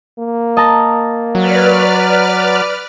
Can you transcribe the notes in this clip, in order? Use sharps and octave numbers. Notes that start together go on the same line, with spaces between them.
A#3
D#5 A5 A#5
F#3 B4 D5 F6